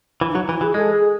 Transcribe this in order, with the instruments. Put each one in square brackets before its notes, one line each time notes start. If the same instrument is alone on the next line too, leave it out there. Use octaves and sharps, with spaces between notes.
[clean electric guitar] E3
[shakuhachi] D#4
[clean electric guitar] F#3 [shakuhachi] E4
[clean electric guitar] E3 [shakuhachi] E4
[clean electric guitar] E3 [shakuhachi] G#4
[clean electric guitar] G#3 [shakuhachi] A4
[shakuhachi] G#4